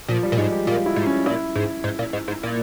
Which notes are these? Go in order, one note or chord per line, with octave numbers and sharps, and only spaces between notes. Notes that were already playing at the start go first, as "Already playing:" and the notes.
A#2 F3
G3
A#2
G#2 G#3
G4
A#2 F4
E4
G#2
C#4
A#2 E4
G#2
G#2
A#2
G#2
G#2
A#2